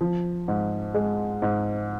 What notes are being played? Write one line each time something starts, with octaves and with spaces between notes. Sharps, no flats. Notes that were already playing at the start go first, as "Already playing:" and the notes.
F3
G#2
G#3
G#2